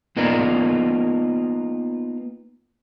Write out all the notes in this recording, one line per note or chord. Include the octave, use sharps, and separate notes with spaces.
A#3 B3 D#4 F4 A#4 D5